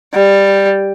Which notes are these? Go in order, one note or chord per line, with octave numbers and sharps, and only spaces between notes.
G3